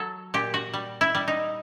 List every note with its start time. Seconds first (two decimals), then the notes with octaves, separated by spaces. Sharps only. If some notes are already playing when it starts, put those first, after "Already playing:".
Already playing: F#3 A4
0.34 A#2 G4
0.54 F#4
0.74 G3
1.01 E4
1.15 G3
1.28 D#4